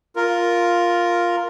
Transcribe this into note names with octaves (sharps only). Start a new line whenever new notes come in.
F4 A#4